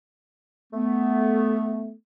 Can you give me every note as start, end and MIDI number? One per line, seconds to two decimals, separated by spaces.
0.72 1.93 57
0.72 1.93 59